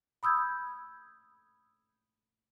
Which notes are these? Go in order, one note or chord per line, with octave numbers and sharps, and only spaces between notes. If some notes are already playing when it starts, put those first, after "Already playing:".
B5 D#6 E6 G6 G#6